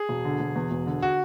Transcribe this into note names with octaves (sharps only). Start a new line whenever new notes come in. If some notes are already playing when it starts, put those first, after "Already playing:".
Already playing: G#4
E1
D3
E1
E2
E1
D3
F#4